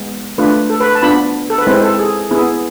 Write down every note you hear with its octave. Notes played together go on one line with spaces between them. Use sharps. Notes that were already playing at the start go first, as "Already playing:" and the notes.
Already playing: G#3 B3
A3 D4 F4 B4
A4
B4
A5
B3 D4 F4 B5
A4
B4
G#3 C4 E4 C5
A4
G#4
B3 E4 G#4